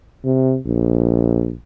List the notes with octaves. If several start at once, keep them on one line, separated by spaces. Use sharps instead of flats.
C3
A#1